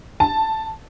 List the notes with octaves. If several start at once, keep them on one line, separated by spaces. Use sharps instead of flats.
A5